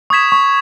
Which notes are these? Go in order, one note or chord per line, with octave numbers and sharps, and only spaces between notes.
C#6 D#6 G#6 B6 E7
C#6